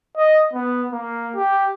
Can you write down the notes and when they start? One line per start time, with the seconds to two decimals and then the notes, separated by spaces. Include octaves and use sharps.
0.17 D#5
0.53 B3
0.92 A#3
1.35 G4